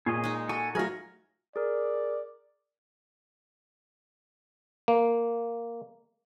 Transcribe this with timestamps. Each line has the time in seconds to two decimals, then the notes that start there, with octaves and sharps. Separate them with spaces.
0.06 A#2 G#4 C#5 D#5
0.24 G#3 D#4
0.49 F#4 A4 G#5 C#6
0.75 F#3 A3 F4 F#4 G#4 A#4 D#5 G#5
1.56 G#4 A#4 D5
4.88 A#3